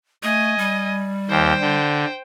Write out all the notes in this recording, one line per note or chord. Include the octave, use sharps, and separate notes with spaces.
A3 D#5 G#5
G3
D#2 C5 G5
D3